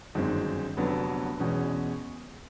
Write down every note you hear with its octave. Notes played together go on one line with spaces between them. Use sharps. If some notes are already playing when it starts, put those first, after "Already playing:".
G1 F#2 D#3 G#3 C4
F1 F2 D3 F#3 B3
E2 B2 G#3 C#4